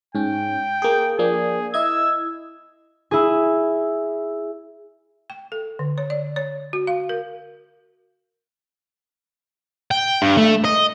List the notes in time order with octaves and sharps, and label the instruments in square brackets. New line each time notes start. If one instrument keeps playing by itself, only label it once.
[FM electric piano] G#2 C#4 [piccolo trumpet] G5
[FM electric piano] A#3 G#4
[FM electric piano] F3 A#3 D4 [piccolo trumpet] G#4
[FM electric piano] E4 D#5 G#6 [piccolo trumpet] E6
[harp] E4 G#4
[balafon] G5
A4
D3
C#5
D5
C#5
F#4
F5
A#4
[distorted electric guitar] G5
G2
A3
D#5